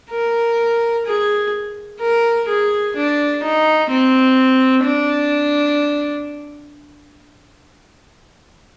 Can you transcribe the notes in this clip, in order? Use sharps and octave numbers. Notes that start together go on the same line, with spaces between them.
A#4
G#4
A#4
G#4
D4
D#4
C4
D4